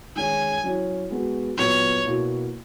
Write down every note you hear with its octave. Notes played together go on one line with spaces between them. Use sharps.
D#3 G#3 C#4 G#5
F#3 C#4 E4
G#3 B3 F#4
A#2 F#3 B3 C#5
B2 A#3 E4